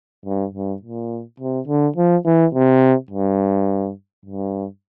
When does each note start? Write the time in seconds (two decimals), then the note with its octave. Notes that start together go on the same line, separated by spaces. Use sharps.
0.26 G2
0.54 G2
0.82 A#2
1.40 C3
1.68 D3
1.96 F3
2.26 E3
2.54 C3
3.11 G2
4.25 G2